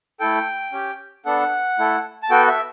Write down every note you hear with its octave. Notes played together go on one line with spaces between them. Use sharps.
A3 E4 A4 G5
C#4 G4
B3 D4 A4 F#5
A3 E4 A4
A5
B3 F#4 A4 G5
E5